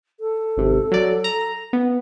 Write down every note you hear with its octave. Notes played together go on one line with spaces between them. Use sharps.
A4
G#1 C3
F#3 D5
A#5
B3